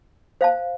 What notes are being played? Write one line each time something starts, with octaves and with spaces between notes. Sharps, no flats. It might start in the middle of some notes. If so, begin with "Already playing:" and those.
C5 F5 A5